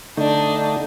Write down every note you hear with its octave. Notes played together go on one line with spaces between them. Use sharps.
D3 A3 D4 D#4